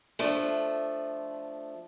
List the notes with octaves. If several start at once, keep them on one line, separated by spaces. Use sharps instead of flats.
F3 A3 D4